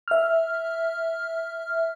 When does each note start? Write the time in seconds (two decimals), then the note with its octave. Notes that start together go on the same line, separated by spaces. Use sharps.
0.08 E5 F6